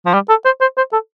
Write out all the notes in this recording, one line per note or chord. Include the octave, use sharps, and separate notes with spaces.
F3
G3
A4
C5
C5
C5
A4